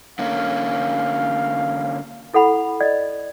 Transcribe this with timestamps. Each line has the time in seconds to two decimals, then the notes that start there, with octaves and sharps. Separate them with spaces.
0.19 D3 A#3 C#4 F5
2.34 E4 A4 F#5 B5
2.81 D5 D#5